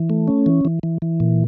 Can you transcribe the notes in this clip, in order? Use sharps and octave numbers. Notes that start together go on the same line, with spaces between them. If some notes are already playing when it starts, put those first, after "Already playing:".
Already playing: E3
A3
C#4
E3
E3
E3
E3
A#2